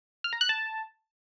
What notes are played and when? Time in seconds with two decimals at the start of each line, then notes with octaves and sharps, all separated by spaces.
0.24 F6
0.33 A#5
0.41 F#6
0.49 A5